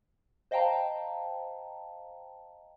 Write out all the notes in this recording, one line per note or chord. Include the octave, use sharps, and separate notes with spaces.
C5 D#5 F5 G5 A5 A#5